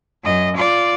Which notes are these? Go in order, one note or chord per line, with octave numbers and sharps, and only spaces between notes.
F#2 D#5
F4 D5